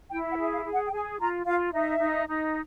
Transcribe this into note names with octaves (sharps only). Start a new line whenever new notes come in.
E4 G5
F#5
G#4
E5
F5
G#4
F#5
G5
G#4 G#5
F4 A#5
F4 F5
D#4 E5
D#4
D#4